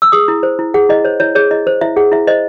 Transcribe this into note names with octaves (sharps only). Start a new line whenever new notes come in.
E6
G#4 D#6
E4
C5
E4
G#4 F#5
E4 D#5
C5 C#5
E4 C#5
G#4 C#5
E4 D#5
C5
E4 E5
G#4 F#5
E4 E5
C5 D#5